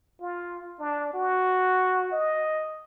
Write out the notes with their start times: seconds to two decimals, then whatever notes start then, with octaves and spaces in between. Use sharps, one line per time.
0.20 F4
0.79 D4
1.14 F#4
2.11 D#5